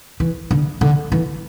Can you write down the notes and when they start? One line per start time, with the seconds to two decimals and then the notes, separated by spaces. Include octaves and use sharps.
0.20 E3
0.51 D3
0.81 D3
1.12 E3